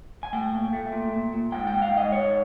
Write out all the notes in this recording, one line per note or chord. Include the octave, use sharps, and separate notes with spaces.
G#5
A3 G5
A#2
A3
A#2
A#2
A#2
G#2 G5
G5
G#2
F5
G#2 D#5
G#2 C#5